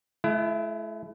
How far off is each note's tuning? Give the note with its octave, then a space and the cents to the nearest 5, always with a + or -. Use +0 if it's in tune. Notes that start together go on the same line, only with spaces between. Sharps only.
A3 -40 E4 +25